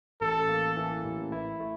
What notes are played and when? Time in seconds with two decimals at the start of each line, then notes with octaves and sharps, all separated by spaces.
0.21 A1 A4
0.49 A#3
0.77 E3
1.04 A1
1.32 E4
1.60 A3